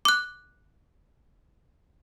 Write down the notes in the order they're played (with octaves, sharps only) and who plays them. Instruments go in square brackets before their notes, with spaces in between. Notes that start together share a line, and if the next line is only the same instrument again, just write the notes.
[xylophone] D6 F#6